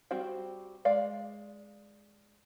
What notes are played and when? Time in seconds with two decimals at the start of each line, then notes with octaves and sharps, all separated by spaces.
0.11 G3 C4 F#4 C5 G5
0.85 G#3 D5 F5